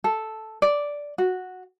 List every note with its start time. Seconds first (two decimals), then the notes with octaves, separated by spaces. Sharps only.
0.04 A4
0.62 D5
1.18 F#4